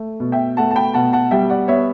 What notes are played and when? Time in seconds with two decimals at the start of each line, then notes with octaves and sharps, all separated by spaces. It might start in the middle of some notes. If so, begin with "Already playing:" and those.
Already playing: A3
0.20 B2
0.32 E5 G5
0.57 A3 F#5 A5
0.71 A5
0.76 G5 B5
0.94 B2 F#5 A5
1.13 F#5 A5
1.31 G3 E5 G5
1.50 D5 F#5
1.68 B3 C#5 E5